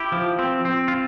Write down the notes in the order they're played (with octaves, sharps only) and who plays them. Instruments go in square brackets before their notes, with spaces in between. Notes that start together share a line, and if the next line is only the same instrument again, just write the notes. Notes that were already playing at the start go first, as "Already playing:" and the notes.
Already playing: [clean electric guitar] E4 G4
F3
C4
C4
F4